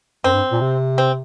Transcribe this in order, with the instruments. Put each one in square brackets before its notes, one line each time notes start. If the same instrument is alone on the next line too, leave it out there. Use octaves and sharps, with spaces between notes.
[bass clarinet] F#2 [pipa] C4
[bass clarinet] G2
A#2
C3
[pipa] C4